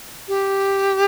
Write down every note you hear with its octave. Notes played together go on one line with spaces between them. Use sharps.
G4